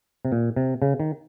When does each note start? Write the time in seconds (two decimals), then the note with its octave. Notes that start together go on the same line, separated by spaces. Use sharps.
0.25 C3
0.32 A#2
0.56 C3
0.82 C#3
1.00 D#3